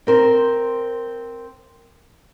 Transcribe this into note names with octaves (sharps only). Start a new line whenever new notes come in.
C4 A#4 C5